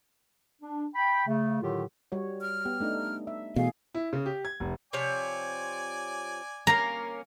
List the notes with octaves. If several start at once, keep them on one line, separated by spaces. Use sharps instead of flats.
D4
G5 B5
C#3 A3
A2 D3 D#3 F#3 F4 G4
G3 F#4 C#5
F6
B3 G4
A3 D4 D#4
E5
B2 E3 A3 G#4 F5
E4
C#3
G4
G#6
F1
C3 F3 C#5 D5 G#5
A#3 C#4 A#4 A#5